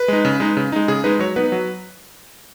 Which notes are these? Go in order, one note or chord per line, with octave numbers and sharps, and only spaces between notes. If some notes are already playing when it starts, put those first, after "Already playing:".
Already playing: B4
G#3 D#4
C#3
G#3 D#4
C#3
G#3 D#4
C#3 G#4
G#3 D#4 B4
F#3 C#5
B3 D#4 B4
F#3